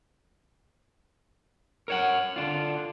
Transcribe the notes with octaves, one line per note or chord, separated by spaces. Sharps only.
A#4 C#5 F#5
D3 D4 F4